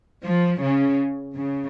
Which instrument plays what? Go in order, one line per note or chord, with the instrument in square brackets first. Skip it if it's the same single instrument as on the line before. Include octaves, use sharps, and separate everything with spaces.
[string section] F3
C#3
C#3